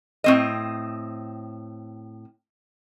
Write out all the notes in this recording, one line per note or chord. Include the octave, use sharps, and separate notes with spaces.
A2 C4 D#5